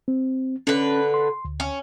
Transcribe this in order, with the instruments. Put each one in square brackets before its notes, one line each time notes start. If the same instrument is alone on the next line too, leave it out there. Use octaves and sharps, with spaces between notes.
[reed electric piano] C4
[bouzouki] D3 B4 [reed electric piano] C#4
[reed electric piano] C6
D2
[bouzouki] C#4